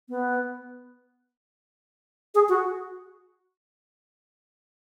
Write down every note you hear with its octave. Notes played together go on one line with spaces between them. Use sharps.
B3
G#4
F#4